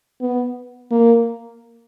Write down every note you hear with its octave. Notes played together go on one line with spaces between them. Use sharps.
B3
A#3